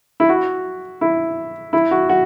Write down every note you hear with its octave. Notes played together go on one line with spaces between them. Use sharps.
E4
F#4
E4
E4
F#4
F#4